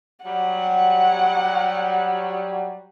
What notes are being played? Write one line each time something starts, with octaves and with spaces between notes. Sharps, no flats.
F#3 G3 F#5